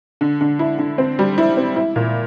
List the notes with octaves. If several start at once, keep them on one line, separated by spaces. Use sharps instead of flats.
D3
D3
E4
D3
C4
G3
E4
C4
E4
A#2